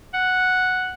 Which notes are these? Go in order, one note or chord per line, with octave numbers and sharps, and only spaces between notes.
F#5